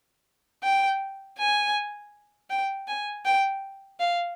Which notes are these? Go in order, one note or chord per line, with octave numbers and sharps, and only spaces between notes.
G5
G#5
G5
G#5
G5
F5